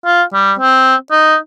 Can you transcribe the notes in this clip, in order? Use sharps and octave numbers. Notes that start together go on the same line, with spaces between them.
F4
G3
C4
D#4